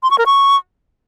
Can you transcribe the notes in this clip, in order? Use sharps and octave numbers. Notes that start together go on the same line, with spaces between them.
C6
C#6
A#4
C#6